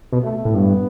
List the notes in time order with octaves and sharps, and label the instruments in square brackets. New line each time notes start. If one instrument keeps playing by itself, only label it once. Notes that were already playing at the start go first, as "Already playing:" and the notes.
[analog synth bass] B2
[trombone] A3
[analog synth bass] A2
[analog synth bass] G2 [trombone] B3